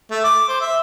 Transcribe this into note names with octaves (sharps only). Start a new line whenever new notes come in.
A3
D6
C5
E5